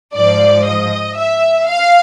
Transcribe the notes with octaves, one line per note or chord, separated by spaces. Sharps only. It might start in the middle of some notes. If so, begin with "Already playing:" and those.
G#2 F3 D5
D#5
E5
F5